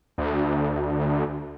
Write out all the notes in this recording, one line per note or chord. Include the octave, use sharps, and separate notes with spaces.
D2